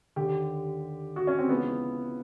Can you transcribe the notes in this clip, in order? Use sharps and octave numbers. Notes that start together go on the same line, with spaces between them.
D#2 D3 G4
F#4
C#4
C4
C#2 C#3 E3 B3